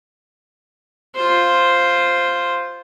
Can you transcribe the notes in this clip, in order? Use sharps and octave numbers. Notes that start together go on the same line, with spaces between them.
F4 C5